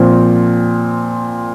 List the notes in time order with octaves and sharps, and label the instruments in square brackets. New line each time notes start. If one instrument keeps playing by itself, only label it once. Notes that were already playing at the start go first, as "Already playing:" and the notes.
Already playing: [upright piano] A#2 F3 C4 F4